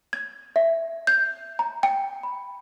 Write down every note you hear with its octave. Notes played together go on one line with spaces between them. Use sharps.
G#6
E5
G6
A#5
G5
B5